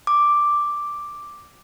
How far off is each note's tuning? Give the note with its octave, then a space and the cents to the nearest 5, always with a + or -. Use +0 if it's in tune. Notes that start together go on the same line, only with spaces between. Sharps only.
D6 +0